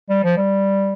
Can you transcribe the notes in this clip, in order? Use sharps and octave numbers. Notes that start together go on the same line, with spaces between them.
G3
F3
G3